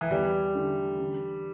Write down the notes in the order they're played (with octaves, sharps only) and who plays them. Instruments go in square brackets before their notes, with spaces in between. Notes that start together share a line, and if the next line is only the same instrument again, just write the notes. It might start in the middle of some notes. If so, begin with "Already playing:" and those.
[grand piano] E3
[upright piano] E2 [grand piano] G3
[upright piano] D3 A3 E4
D3